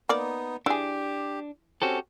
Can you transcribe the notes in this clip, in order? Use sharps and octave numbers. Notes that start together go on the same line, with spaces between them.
A#3 B3 D#4 D5
E3 D4 G4 G#4
C4 C#4 F#4 G4 A4